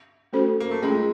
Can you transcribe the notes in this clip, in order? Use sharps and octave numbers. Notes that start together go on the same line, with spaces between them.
A3 C#4 F#4 A4 C5
A#3
A3
G#3 A3 C#4 F4